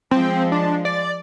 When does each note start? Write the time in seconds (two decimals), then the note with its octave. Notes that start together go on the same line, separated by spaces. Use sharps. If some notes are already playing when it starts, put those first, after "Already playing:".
0.11 F3 G#3 C4
0.52 D4
0.85 D5